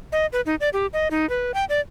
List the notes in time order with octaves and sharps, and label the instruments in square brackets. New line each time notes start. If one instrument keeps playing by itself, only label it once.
[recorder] D#5
B4
D#4
D5
G4
D#5
D#4
B4
G5
D5